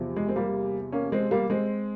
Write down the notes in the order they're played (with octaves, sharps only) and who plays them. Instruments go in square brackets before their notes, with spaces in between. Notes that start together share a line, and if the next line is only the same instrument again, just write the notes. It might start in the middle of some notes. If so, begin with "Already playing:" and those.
Already playing: [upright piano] E2 C3 F3
G#3
C4
G3 A#3
A#3 C#4
G#3 C4
G3 A#3
G#3 C4